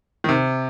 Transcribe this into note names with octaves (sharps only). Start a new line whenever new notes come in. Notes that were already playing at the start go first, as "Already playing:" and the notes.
D#3
C3